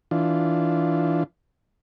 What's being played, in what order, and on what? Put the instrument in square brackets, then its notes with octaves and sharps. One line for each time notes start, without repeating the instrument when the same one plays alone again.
[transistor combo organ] E3 D4 F4